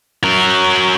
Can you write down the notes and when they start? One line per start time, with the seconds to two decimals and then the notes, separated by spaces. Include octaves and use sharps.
0.24 F#3 A#4